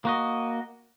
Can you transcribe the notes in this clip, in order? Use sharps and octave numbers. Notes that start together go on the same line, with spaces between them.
A#3 F#4 D#5